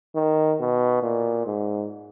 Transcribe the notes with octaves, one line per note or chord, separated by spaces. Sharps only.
D#3
B2
A#2
G#2